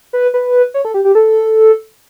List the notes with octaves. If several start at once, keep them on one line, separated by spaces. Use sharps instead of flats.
B4
B4
C#5
A4
G4
G4
A4